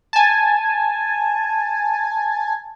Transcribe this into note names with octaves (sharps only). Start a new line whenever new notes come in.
G#5 A5